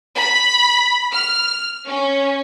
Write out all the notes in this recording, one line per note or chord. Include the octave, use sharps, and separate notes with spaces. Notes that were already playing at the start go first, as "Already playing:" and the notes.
B5
F6
C#4